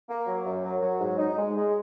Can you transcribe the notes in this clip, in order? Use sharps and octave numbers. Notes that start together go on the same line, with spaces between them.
A#3
F#3
F#2
F#3
F#3
G#2
D#4
G#3
G#3